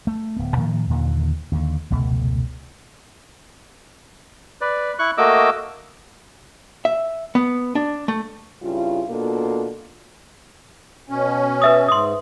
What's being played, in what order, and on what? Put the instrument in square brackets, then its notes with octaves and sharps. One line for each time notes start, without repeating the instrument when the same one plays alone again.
[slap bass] A3
D1 B3
A2 D#3 F3 A#3
D#2 A#2 D3 D#3
D#2 D3
F1 C#2 B2 A3
[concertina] B4 D5
E4 C#6 F#6
A3 A#3 F#4 D#5 D6 E6
[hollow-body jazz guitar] E5
B3
D4
A3
[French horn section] G2 C#3 E4 F4
B2 A#3 D4 F4 A4
[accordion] B2 C#4
[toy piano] B4 E5 D#6
[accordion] G#2 [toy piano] C6 D#6